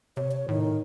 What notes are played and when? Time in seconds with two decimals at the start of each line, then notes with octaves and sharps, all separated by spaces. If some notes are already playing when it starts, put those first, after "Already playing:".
0.17 C3 C#5
0.32 C#5
0.49 A2 D#3